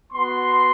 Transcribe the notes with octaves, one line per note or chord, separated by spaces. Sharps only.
B3 F#4 C6